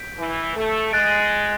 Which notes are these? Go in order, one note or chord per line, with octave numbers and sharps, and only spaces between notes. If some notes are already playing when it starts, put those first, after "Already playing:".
Already playing: G6 B6 D7
E3
A3
G#3 F#6 A6 D7